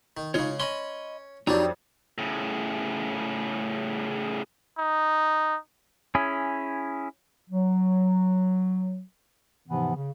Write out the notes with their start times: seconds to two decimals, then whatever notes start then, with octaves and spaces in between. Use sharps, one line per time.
0.17 D#3
0.34 C#3 G#3 D#4 F4 C#5
0.60 C#4 D#5 B5 C6
1.47 F2 F#3 G3 D4 D#4 D5 A#5
2.18 A2 C#3
4.78 D#4
6.15 C#4 E4 G#4
7.49 F#3
9.68 G#2 C3 E3 F3 B3
9.95 C#3